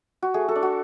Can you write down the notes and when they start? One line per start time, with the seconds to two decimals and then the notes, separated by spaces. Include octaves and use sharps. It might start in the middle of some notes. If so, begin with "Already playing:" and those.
0.22 F#4
0.34 A3 G#4
0.48 F#4 A4
0.56 D4
0.63 F#4